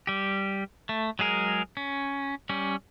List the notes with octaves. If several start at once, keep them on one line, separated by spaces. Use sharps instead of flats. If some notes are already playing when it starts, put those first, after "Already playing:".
G3 G4
A3
F#3 G#3 G#4 A#4
C#4
G3 C#4